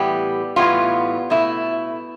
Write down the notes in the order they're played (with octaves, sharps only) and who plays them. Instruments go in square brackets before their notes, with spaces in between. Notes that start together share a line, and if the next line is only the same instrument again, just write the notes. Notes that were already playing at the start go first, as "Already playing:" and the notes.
Already playing: [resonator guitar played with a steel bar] A2 E3 G3 B3 G4
A2 E3 G3 B3 F4
B2 A3 E4